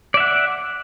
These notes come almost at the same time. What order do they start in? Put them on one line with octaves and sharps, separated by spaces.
D5 E5 F#5